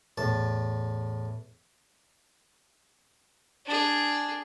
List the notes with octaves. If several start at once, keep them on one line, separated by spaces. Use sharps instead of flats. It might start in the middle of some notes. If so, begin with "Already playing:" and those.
E2 A2 A5
D4 G#4